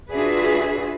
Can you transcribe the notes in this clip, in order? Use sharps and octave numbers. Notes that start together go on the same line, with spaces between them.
D4 F4 F#4 G#4 B4 E5